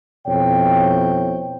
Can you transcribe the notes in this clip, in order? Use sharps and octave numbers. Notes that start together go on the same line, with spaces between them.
F2 B2 E4 C5 C#5 G5